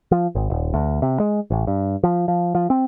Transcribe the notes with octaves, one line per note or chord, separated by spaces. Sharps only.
F3
G#1
D#1
D2
C3
G#3
A1
G2
F3
F3
F3
C4